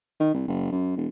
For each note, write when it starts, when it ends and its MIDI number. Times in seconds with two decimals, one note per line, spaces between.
0.20 0.31 51
0.34 0.45 36
0.48 0.68 30
0.71 0.92 42
0.96 1.07 28